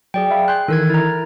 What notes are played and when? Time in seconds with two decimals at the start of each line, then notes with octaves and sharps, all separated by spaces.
0.14 F#3 G#4 D5 G5
0.31 E5 F5 B5
0.48 G#5 C6 F#6 G6
0.68 D#3 E3 A4 A#4 G#6
0.90 E4 A#5